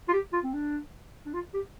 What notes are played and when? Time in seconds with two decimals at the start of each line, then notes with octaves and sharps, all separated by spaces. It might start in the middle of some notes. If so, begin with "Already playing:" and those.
0.08 F4
0.13 G4
0.33 F4
0.44 C4
0.54 D4
1.26 D4
1.33 F4
1.54 G4